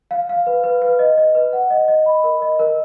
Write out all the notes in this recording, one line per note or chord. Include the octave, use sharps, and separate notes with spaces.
F5
F5
B4
B4
B4
D#5
D#5
B4
F#5
D#5
D#5
B5
A#4
D#5
A#4